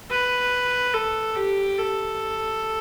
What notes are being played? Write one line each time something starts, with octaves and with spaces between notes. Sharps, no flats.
B4
A4
G4
A4